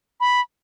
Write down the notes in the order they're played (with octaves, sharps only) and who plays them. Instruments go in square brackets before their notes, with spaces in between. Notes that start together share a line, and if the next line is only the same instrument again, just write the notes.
[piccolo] B5